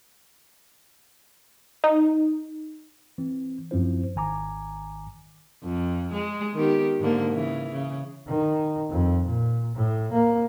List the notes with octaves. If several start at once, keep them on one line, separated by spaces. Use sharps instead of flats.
D#4
E3 C4
F#2 F3 C4 E4 C5
G#1 D#3 G#5 A#5 D6
F2
G#3
D#3 B3 G4
G#2 D3 A#3
C#3 E3
C#3
D#3
F2
A#2
A2
A#3